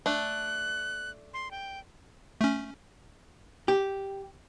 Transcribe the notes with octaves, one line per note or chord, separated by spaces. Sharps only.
A3 D4 F#6
C6
G5
A3 C#4
G4